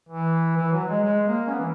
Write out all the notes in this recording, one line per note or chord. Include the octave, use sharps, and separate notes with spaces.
E3
E3
F#3
G#3
G#3
A#3
C#4
B3
E3